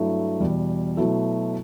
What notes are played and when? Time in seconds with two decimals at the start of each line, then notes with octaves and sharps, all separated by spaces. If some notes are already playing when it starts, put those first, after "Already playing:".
Already playing: G2 F#3 A3 E4
0.40 E2 B2 G3
0.97 B2 F#3 A3 E4